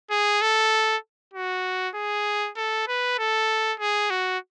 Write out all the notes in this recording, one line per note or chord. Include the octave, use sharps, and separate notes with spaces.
G#4
A4
F#4
G#4
A4
B4
A4
G#4
F#4